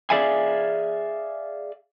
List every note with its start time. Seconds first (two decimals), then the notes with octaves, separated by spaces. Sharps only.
0.10 G#4 D5 E5 F5 G#5